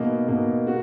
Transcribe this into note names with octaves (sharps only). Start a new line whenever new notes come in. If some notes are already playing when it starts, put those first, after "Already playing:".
Already playing: B2 A#3 D#4
B2 A#3 D#4
F#4